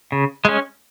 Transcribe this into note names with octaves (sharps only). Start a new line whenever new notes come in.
C#3
G#3 C#4